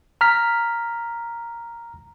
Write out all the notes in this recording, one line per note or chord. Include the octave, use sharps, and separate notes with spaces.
A#5 F6 B6